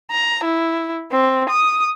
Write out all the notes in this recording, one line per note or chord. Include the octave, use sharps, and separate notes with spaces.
A#5
E4
C4
D#6